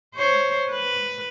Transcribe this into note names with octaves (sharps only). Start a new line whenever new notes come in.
C5 C#5
B4